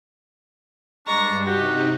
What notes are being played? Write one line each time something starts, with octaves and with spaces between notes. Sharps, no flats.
G2 G#3 D4 A#5 C#6
C3 D#4 F#4 G4